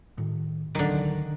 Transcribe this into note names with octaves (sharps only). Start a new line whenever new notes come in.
A2 D#3
D1 C2 D3 D#3 F#3